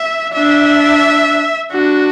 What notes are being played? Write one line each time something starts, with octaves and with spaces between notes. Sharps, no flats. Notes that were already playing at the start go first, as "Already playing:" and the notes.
Already playing: E5
D4 E5
D4 F#4